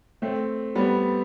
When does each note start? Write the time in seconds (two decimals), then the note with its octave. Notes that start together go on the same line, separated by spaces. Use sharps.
0.22 A3 C4
0.75 G3 B3